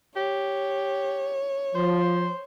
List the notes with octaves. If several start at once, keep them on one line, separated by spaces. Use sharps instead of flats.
G4 C#5
F3 C5